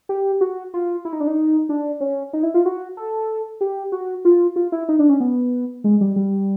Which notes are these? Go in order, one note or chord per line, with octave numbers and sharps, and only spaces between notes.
G4
F#4
F4
E4
D#4
D4
D#4
D4
C#4
D#4
E4
F4
F#4
A4
G4
F#4
F4
F4
E4
D#4
D4
C#4
B3
G#3
G3
G3